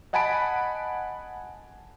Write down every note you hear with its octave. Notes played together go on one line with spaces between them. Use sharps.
D#5 F#5 G#5 A5 B5 D7